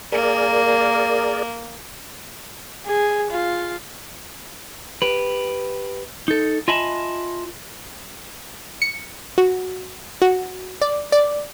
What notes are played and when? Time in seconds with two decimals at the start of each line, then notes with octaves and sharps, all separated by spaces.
0.12 A#3 G#4 A#4 D5
2.86 G#4
3.30 F4
5.02 G4 B4
6.28 D#4 A4
6.68 F4 D#5 E5 G#5 A5 B5
8.82 C#7
9.38 F#4
10.22 F#4
10.82 D5
11.12 D5